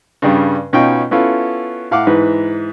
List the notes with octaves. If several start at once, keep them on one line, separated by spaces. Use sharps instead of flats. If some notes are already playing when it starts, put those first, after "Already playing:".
G2 C#3 G3
B2 C#4 D#4 F4 G5 B5
B3 C#4 E4 F4 A4
A2 F5 F#5 D6
G#2 E3 B4